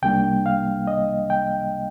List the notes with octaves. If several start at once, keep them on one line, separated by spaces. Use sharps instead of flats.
C2 C3 G3 A#3 D4 G5
F5
D#5
G5